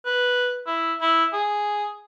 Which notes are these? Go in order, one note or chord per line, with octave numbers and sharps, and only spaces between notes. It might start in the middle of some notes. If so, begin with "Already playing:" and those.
B4
E4
E4
G#4